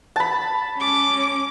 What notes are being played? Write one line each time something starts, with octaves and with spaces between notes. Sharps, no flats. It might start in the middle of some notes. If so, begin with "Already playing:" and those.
A5 B5
C#4 D6